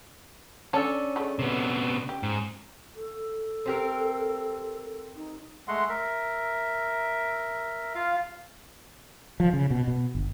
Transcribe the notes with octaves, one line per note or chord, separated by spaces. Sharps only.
C#4 D4 A4 C#5 A5
G#3 A3
C3 B3
G4
G#2
A4
C4 G4 A#4
D#4
G#3 A3 F#5 C6
A#4 E5
F4 F5
F3
C#3
B2
B2
G1